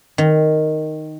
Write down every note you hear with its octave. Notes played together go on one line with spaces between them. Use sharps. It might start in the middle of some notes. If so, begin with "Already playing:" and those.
D#3